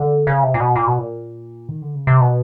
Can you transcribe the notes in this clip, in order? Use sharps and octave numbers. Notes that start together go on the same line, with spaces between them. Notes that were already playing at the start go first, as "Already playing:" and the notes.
Already playing: D3
C#3
C3
A#2
B2
A#2
B2
A#2
D#3
D3
C#3
C3
B2